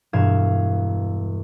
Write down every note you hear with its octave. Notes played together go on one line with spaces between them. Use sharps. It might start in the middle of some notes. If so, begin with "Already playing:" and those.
E1 G2 F5 G#6 E7